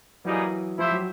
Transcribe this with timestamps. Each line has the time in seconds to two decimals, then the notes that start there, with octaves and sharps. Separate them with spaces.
0.25 E3 F#3 G3 A#3 D#4 G#4
0.78 F3 E4 G4 C5 E5
0.91 F#3